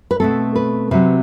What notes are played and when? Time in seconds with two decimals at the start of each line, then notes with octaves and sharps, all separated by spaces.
0.11 B4
0.20 B2 A3 C4 A4
0.56 B4
0.91 C3 F#3 C4 B4